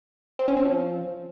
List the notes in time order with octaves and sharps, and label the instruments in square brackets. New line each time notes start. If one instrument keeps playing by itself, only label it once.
[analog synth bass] C4
C#4
C4
F3